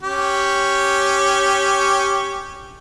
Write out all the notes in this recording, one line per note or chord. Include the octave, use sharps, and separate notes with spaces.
C#4 G4